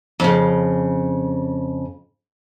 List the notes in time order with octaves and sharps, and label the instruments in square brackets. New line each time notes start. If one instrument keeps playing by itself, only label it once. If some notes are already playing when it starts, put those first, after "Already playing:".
[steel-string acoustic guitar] F2 C#3